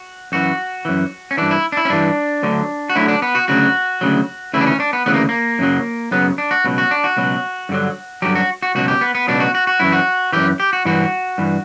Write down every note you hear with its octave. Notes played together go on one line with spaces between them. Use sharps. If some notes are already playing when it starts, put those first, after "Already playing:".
Already playing: F#4
F#2 E3 F#4
F#2 E3
C#4
G2 E3 D4
E4
D4
E4
C#4
G2 E3 D4
D2 D3 F#3
F#4
D2 D3 F#3 E4
D4
B3
F#4
D2 C#3 F#3 F#4
D2 C#3 F#3
D2 C#3 E3 E4
D4
C#4
D4
B3
D2 C#3 E3 B3
A#3
A#3
F#2 C#3 F#3
F#2 C#3 F#3 B3
D4
F#4
C#2 B2 F#3
F#4
D4
F#4
C#2 B2 F#3
G2 D3 F#3
G2 D3 F#3 G4
F#4
F#4
C#2 B2 F#3 F#4
G4
B3
B3
C#2 B2 F#3 D4
F#4
F#4
F#4
F#2 E3 E4
F#4
F#2 E3 G4
G4
F#4
G2 E3 F#4
G2 E3